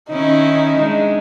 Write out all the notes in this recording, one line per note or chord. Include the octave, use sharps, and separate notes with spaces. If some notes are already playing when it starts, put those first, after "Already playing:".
D#3 C#4 D#4 E4
G#3 D4